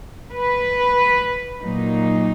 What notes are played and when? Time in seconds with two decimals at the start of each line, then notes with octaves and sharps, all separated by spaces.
0.32 B4
1.62 A#2 F#3 A#3 D#4